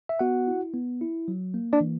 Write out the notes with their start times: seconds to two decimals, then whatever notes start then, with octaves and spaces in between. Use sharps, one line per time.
0.09 E5
0.19 B3 F#4 F#5
0.48 E4
0.74 B3
1.01 E4
1.28 F#3
1.54 A#3
1.73 D4 D5
1.81 E3